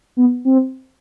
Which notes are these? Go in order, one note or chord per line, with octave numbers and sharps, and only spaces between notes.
B3
C4